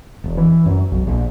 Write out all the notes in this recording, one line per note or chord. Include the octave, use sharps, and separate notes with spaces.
E1
E3
F#2
B1
A#1